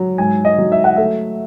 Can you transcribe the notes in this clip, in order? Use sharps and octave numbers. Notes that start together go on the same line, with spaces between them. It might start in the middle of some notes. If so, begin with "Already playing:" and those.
Already playing: F#3
G#2 G#5
D#5
F#3
E5
F#5
A3 E5